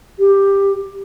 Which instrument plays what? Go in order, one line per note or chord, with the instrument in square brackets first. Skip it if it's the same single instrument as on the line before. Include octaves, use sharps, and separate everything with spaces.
[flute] G4